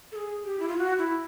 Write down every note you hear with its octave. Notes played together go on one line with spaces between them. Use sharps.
A4
G#4
G4
E4
F4
F#4
E4